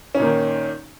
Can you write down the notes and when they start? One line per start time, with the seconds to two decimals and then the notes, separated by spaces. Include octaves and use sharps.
0.15 C#4
0.17 D#4
0.20 A#2
0.22 A#3
0.25 D#3